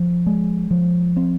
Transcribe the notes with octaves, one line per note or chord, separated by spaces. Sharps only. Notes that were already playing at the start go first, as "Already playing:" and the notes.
Already playing: F3
G#3
F3
C4